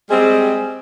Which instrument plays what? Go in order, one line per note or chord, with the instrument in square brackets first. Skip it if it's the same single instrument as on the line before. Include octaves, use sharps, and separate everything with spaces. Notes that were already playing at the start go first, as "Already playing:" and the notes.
[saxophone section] G3 G#3 C4 G#4